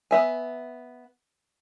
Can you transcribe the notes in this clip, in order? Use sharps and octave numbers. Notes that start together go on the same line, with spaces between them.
B3 E5 G#5